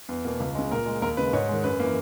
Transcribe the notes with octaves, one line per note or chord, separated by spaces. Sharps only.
E2
B2 A#3
C#2
C#3 G#3
A#2 A#4
G#3
D#2 A#4
C#3 G#3 B4
G#2 C#5
D#3 G#3
F#2 B4
E3 A#3